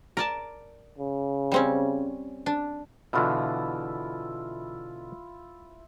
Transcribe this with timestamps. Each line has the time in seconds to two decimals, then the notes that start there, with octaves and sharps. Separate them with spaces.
0.17 A#4 D5 A5
0.98 C#3
1.52 G3 C4 C#4
2.46 D4
3.13 B2 D3 E3 E4 F4